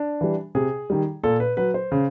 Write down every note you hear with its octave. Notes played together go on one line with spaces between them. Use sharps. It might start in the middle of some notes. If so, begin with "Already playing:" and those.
Already playing: D4
E3 G3
C3 G#4
D#3 G3
A#2 A4
B4
F#3 B4
C5
C#3